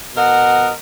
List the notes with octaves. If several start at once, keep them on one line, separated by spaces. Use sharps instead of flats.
B2 A#4 D#5 F#5